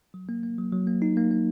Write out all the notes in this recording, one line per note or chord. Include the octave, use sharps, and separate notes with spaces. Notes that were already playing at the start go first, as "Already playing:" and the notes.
F#3
A#3
A#3
F#3
F#3
A#3
D#4
A#3
A#3